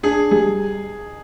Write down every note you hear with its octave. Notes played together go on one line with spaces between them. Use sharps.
D4 G#4
G3 G#4